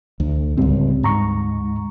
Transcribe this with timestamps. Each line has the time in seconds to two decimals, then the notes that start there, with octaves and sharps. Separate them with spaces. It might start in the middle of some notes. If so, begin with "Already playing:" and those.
0.20 D2
0.57 C#2 G#2 G3 C4
1.03 D2 G#2 A#5 C#6